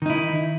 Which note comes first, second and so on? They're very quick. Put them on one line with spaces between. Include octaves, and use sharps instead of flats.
D#3 D#4 E4